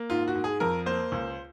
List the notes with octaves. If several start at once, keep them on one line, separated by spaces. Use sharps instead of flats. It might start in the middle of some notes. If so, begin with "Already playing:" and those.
Already playing: A#3
G#2 F4
F#4
G#2
G#4
F2 A#4
A#3 C5
C#2